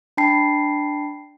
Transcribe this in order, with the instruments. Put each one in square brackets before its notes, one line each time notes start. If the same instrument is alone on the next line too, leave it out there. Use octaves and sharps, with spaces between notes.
[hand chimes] D4 G5 A5 B5 C7